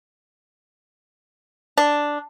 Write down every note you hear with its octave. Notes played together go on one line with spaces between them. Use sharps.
D4